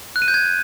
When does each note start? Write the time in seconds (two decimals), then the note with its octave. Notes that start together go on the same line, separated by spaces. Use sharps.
0.16 F#6
0.22 D#7
0.28 G6
0.34 G#6